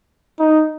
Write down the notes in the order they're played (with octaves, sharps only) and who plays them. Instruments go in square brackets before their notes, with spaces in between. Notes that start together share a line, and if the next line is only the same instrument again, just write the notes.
[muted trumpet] D#4